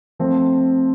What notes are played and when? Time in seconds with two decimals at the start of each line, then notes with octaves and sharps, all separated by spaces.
0.19 F3 A3 C4